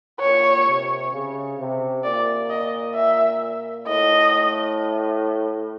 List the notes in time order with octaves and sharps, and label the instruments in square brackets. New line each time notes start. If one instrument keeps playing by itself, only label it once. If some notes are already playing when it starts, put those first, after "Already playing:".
[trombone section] A#2 [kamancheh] C#5
[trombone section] C3
C#3
C3
[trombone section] A#2 [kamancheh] D5
[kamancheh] D#5
E5
[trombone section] A2 [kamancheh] D#5